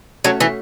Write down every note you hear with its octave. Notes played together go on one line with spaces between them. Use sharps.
F#3 A3 C#4 F#4 A4 C#5
E3